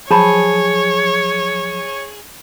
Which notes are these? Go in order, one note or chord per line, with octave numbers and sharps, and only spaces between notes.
F3 F#3 G#4 C5 C#5 A5 B5